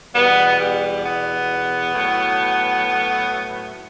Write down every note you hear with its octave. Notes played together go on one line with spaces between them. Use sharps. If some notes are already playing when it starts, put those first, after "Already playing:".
E2 B2 G3 B3
G3
B3
A2 F#3